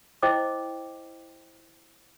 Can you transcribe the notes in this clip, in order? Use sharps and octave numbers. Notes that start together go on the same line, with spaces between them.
E4 C5 D#5 G5 D6